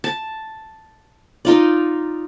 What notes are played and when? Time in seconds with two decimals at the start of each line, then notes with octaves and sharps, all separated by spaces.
0.04 A5
1.45 D#4 F4 D5